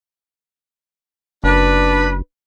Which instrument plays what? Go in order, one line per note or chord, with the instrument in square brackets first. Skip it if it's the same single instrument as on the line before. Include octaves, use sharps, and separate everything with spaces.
[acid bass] F#1 [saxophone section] D4 B4